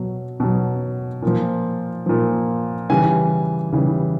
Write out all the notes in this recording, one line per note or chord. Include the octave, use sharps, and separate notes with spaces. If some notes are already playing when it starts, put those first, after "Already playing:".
Already playing: B2 F#3
B2 F#3
A#2 F3
A#2 F3
C#3 E3 G3 G#5
C#3 E3 G3